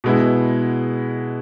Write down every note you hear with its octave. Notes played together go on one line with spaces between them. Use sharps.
B2 G#3 B3 E4